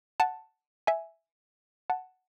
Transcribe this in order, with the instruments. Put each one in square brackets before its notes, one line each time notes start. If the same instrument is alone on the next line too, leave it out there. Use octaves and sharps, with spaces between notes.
[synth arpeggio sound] F#5 A5
E5 G#5
F#5 A5